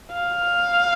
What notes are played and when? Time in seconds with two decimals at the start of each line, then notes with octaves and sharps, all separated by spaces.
0.13 F5